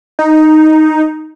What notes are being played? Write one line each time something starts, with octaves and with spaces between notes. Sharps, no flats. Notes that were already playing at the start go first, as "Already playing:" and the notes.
D#4